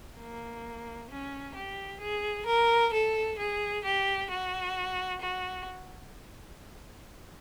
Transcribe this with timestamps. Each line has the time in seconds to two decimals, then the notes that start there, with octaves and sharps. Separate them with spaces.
0.17 A#3
1.09 C#4
1.54 G4
2.01 G#4
2.47 A#4
2.93 A4
3.38 G#4
3.85 G4
4.30 F#4
5.22 F#4